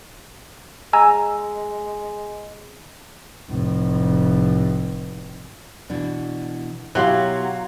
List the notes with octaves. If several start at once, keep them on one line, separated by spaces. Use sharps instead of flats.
G#3 G#5 A#5 E6
F1 A2
B2 E3 D4
B2 F#3 E4 G4 C#5 F5 C6 F#6